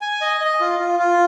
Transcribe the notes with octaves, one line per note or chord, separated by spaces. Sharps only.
G#5
D#5
D#5
F4
F4
F4